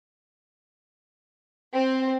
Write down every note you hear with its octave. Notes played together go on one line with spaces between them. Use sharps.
C4